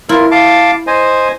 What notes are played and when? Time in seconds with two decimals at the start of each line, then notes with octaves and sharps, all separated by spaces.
0.09 E4 F4 A#4
0.31 F5 A5 D6
0.87 C5 D#5 G#5